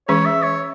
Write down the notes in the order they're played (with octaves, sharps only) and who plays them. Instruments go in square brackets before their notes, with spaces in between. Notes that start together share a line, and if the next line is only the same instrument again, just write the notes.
[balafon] E3 G#3 C#4 G#4 [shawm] C#5
[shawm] E5
C#5